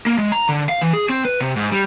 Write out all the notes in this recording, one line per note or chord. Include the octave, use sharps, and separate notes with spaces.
A#3
G#3
A#5
D3
F5
E3
G#4
C4
B4
C3
G#2
G3